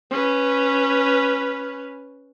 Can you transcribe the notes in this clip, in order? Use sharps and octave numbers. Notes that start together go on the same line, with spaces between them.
C#4 B4